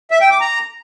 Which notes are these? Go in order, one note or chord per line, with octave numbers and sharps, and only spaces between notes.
E5
G5
D6
A#5